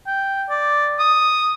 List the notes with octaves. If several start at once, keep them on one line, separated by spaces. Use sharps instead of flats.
G5
D5
D#6